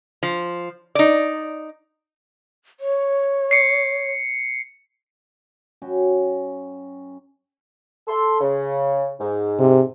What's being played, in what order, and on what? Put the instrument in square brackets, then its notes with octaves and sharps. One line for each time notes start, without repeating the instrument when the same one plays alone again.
[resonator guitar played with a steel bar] F3
D#4 D5
[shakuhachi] C#5
[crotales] C7 C#7
[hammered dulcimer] F#2 C#4 F#4 G5
[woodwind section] A4 C6
C#3
G#2
[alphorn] C3